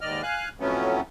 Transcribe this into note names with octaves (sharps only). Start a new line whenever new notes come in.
D#2 G#2 D#3 D5 D#5 F6
F5 G#5 F#6
F2 A2 F#3 A3 B3 C#4